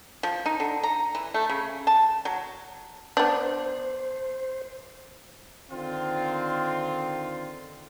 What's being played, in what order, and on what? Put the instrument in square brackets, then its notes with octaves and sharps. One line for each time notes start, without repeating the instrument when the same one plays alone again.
[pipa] F3
D#4
D3
A#5
E3
A3
C#3
A5
F#3
[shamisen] B3 D4 [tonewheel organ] C5
[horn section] D3 D#3 C4 F4